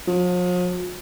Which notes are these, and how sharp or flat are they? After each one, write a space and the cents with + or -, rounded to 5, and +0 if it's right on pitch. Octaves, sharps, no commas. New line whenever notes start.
F3 +45